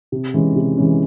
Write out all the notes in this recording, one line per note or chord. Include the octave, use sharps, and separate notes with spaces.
C3
E3 G#3 C#4
C3
E3 G#3 C#4